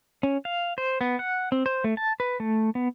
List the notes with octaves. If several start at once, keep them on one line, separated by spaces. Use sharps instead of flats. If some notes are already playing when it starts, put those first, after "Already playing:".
C#4
F5
C5
B3
F#5
C4
C5
A3
A5
B4
A3
B3